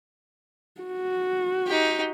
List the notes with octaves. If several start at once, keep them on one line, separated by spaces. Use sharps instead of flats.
F#4
D#4 G4